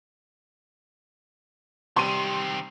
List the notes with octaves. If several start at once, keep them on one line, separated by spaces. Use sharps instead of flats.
C3 D#3 G3 C4 C6 D#7